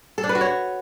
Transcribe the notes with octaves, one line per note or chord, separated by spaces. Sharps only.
A4
D4
B4
F#4
C#5